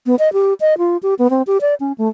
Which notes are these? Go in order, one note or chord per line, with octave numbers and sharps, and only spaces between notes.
B3
D#5
G4
D#5
F4
G4
B3
C4
G4
D5
C#4
A3